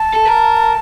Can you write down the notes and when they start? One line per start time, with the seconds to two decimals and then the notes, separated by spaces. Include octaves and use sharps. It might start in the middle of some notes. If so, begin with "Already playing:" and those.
Already playing: A5
0.14 A4
0.25 A#4